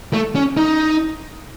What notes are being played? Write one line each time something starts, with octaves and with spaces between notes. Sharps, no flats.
A3
C#4
D#4